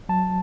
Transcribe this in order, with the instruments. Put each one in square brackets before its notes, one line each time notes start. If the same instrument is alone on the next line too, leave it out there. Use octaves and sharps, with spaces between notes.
[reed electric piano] F#3 A5